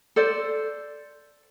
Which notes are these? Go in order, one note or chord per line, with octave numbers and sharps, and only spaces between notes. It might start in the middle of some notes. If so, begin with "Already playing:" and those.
A4 C5 D5